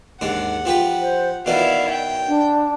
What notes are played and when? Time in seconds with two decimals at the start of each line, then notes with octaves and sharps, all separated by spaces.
0.21 D#2 G#2 D4 F#5
0.65 F3 G4 B4
1.00 C5
1.46 B2 D#3 F#3 E4 D5 F5
1.90 G5
2.28 D4